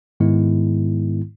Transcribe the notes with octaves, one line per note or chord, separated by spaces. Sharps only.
G#2 D#3 G#3 B3 E4